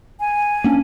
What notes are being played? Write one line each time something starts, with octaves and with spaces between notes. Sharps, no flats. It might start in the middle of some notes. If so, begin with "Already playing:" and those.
G#5
A#3 C#4 D4